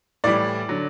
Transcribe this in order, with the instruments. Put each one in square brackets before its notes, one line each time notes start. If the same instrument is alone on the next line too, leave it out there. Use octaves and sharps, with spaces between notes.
[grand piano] A2 E3 G3 D5
D3 F#3